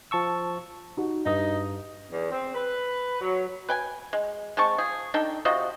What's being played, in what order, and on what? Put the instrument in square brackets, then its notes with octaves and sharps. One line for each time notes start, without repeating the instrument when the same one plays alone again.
[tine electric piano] F3 A5 C#6 E6
[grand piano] D#4 F#4
[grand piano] G2 B4 D#6 [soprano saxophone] D#4
[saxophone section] E2
C4
B4
F#3
[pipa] B4 G5 G#5
G#3
G#3 C4 A5 C#6
F3 G#4
D4 D#4 A4 G5
C3 F4 F#4 D#5